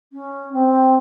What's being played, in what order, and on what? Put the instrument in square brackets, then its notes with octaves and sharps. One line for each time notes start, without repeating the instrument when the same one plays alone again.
[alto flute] C#4
C4